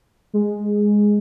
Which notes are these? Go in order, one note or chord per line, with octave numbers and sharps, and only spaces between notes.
G#3